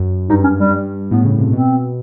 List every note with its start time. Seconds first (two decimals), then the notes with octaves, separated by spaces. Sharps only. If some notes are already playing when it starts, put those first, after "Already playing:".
Already playing: F#2
0.29 G2 D#4
0.44 C#4
0.57 G3
0.70 G2
1.11 A2 B3
1.25 C#3
1.38 C3
1.52 B2 C4